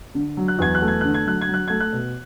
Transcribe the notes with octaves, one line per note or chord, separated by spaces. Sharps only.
D3
F#3
F#6
E2 G#6
F#6
A3
G#6
D3 F#6
G#6
F#3 F#6
G#6
F#3
F#6
A3 G#6
F#6
B2